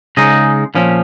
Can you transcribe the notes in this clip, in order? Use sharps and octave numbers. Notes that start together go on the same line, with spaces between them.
C#3 G#3 D#4 D#5
A#2 F3 C#4